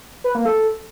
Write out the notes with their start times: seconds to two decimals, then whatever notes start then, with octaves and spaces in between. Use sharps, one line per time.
0.24 B4
0.35 A#3
0.45 A4